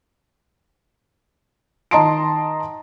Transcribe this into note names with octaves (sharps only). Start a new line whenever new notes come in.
D#3 D#5 A5 A#5 C6 D7